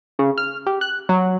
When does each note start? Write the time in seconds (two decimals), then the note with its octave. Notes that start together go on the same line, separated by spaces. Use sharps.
0.19 C#3
0.38 F6
0.66 G4
0.81 F#6
1.09 F#3